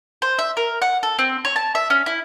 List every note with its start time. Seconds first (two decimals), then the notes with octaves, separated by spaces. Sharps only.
0.22 C5
0.39 E5
0.57 A#4
0.82 F#5
1.03 A4
1.19 C4
1.45 C#5
1.56 A5
1.75 E5
1.90 C#4
2.06 E4